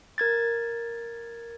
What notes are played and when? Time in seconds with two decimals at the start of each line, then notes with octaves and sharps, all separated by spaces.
0.18 A#4 G#6 A6